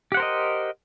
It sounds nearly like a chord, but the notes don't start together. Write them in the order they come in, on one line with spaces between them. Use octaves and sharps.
G4 F#5 C5 A#4 D#5